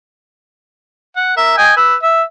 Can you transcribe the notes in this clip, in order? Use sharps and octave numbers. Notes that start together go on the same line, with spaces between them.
F#5
A#4 E5
D#5 G5 G#5
B4 E6
E5